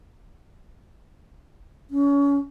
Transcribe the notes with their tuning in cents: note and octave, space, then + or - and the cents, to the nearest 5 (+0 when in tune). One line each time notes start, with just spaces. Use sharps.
C#4 +30